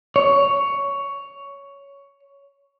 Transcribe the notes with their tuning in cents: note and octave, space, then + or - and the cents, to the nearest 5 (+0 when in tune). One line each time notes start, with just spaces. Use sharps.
C#5 +10